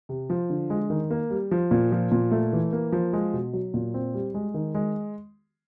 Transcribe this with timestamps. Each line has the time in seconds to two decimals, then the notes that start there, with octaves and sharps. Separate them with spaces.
0.09 C3
0.30 F3
0.50 D3
0.70 G#3
0.90 D#3
1.10 A#3
1.31 G3
1.51 F3
1.71 A#2
1.92 F3
2.12 A#2
2.31 A3
2.53 E3
2.72 A#3
2.92 F3
3.13 G#3
3.34 B2
3.53 F#3
3.74 A#2
3.94 C4
4.14 G3
4.34 G#3
4.54 D#3
4.75 G#3